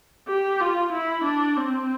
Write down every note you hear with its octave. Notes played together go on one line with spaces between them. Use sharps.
G4
F4
E4
D4
C4